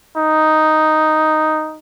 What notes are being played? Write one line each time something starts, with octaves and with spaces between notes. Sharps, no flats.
D#4